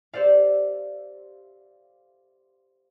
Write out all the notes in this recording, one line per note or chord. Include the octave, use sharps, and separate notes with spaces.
G4 A4 C5 D5 F5